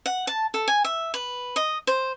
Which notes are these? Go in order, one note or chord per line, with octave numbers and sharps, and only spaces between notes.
F#5
A5
A4
G#5
E5
B4
D#5
C5